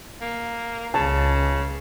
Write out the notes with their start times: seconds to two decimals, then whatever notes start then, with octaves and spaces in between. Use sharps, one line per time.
0.21 A#3
0.94 C#2 C#3 A5